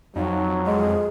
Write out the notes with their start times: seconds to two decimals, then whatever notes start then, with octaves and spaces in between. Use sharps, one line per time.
0.16 F2 F#3 D#4
0.67 G#3 G#4